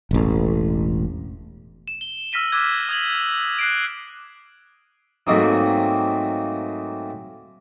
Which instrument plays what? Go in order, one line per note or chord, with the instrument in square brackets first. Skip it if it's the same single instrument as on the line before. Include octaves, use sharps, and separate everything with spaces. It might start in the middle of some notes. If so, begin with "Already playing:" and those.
[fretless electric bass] E1 A1
[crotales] E7
G7
E6 F6 A#6 B6 D#7 G7
D6 E6 F#6 G#6
D#6 G#6 F#7
F#6 C7 D7
[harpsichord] G#2 F#3 A3 A#3 C4 D#4